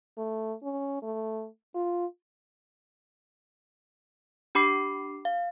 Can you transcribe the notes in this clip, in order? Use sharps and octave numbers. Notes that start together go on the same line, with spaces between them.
A3
C#4
A3
F4
D4 G4 B5 D6 C7
F5